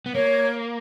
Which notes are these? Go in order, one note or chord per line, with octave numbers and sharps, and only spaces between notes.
B3
A#3 C#5